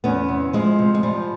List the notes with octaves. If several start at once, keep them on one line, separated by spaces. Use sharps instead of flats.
E2 B3 C#4
C3
F3 G#3
C3
G#3
F3 G3